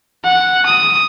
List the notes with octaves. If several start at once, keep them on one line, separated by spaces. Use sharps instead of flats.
F#5
D#6